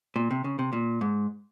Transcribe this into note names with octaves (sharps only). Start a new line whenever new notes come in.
A#2
C3
C#3
C3
A#2
G#2